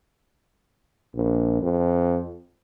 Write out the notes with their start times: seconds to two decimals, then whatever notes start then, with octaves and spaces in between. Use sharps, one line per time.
1.15 A#1
1.62 F2